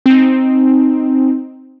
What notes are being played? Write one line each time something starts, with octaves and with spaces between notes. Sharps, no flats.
C4 D#4